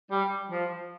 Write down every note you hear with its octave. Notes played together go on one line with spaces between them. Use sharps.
G3
F3